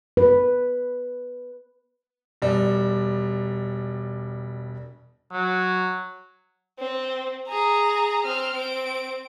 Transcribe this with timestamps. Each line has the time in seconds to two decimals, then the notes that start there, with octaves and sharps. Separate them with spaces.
0.17 B4
2.42 E1 G3
5.32 F#3
6.79 C4
7.48 G#4 A#5
8.26 C4 F6
8.55 C4 D7